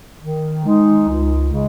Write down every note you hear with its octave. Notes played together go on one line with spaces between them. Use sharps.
D#3
G#3 D#4
C#2
C#3 G#3